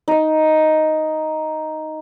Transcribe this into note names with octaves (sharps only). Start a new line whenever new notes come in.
D#4 D#5